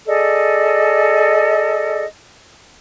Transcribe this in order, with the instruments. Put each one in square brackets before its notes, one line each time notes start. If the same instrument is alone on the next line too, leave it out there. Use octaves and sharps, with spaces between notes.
[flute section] G#4 A4 D5 D#5